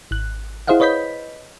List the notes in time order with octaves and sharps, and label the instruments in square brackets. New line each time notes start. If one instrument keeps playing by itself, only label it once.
[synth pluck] G#1 F#6
E4 G#4 C5 D#5 F5 F#5
B4 C#5 D#5 B5 G6 B6